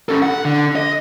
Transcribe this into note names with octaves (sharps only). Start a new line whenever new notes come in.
C#4 A4
F#5
D3
D#5